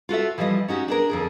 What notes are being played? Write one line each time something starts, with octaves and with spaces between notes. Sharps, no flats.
F4 F#4 A4 E5
E3 F3 G3 C#5 D#5
C#4 D#4 F#4 G4
D4 G#4 A#4
F2 D3 G#4